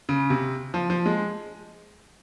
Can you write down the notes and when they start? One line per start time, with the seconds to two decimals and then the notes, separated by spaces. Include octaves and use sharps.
0.09 C#3
0.30 C3
0.74 F3
0.90 F3
1.06 G#3